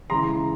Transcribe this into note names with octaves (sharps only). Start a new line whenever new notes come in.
C#3 E3 G#3 A#5 C6